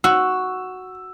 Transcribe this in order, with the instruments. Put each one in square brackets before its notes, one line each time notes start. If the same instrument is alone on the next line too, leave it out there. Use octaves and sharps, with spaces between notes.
[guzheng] F#4 [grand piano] E6